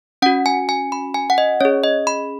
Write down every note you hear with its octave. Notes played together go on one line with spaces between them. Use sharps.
C#4 F#4 F#5
G#5
G#5
B5
G#5
F#5
D#5
C#4 G#4 C#5
D#5
B5